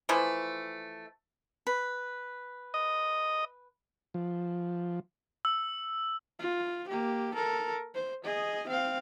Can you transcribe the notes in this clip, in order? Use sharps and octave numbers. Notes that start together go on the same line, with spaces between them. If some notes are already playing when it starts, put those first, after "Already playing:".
E3 F3 A3
B4
D#5
F3
E6
F4
A#3 G4
A4 A#4
C5
G#4 D#5
C4 F5